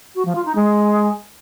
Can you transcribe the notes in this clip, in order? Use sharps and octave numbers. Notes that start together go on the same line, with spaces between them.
F#4
F3
F4
D#4
G#3